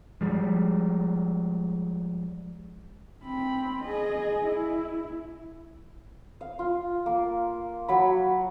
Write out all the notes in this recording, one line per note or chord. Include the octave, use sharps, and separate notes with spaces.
F3 G3 G#3
C4 B5
G#4 D#5
E4
F5
F4
A#3
F#3 B5